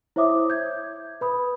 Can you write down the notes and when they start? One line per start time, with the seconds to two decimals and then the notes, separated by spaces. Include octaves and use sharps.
0.16 E4 C5 C#5 E5 D6 D#6
0.50 G6 G#6
1.21 B4 B5 D#6